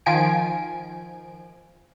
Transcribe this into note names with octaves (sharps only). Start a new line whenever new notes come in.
D#3 F3 G#5 D7